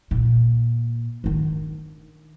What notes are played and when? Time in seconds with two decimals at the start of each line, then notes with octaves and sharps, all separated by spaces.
0.11 A#2
1.24 D#3 D4